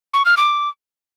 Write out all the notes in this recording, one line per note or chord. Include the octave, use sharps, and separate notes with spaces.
C#6
F6
D6